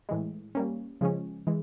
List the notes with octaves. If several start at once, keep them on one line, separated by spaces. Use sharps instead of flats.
A2 E3 G#3
G3 A#3 C#4
C#3 F3 G#3 C#4
E3 G#3